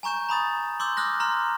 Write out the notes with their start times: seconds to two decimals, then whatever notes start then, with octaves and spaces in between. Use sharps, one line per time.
0.03 G#5 A#5 C#6 G6 E7
0.29 A#5 B5 D#6 A6
0.80 C6 D6 E6 G6
0.97 D#6 F6 F#6 A#6
1.20 A#5 C6 F6